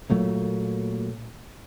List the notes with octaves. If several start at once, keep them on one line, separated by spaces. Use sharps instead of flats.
A#2 F#3 A3 A#3